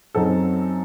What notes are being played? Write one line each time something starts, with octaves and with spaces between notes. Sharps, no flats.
F#2 F#3 C4 D#4 A4